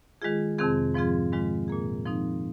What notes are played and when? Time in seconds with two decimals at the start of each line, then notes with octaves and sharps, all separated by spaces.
0.22 D#3 G#3 F4 G#4
0.58 F2 C3 D#3 C4 G#4
0.94 G#2 F3 C4 F4 G#4
1.32 G#2 D#3 G#3 F4
1.68 A#2 A#3 G#4
2.05 F3 C4 D#4